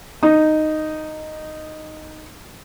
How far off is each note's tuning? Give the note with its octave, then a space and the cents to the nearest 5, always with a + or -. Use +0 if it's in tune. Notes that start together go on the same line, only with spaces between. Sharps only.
D#4 -5